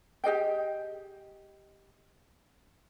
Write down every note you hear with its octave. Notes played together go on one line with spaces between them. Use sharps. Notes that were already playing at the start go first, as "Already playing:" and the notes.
G4 G#4 D#5 G5